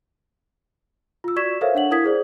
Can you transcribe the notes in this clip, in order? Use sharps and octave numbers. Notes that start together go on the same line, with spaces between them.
F4 E6
F#4 D5 C#6 G#6 B6 E7
A4 A#4 C5 C#5 E5 F5
D4 C#5 F#5 F#7
E4 A#4 D#6 G#6 B6
G#4 C5 D5